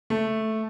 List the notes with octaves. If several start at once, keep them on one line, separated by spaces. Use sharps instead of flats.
A3